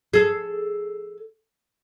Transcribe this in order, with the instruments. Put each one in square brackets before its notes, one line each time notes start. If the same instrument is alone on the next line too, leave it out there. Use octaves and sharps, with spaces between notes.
[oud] G#4 A4